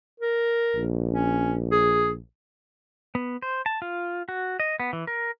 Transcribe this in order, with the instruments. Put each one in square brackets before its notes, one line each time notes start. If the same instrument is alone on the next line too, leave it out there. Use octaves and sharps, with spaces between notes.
[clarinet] A#4
[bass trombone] A#1
[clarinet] C#4
G#4
[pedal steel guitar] B3
C5
A5
F4
F#4
D#5
B3
E3
A#4